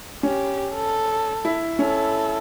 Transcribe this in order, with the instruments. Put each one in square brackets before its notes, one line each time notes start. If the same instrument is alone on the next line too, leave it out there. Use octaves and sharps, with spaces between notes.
[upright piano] C#4 [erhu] G4
[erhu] A4
[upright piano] E4
[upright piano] C#4 [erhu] A4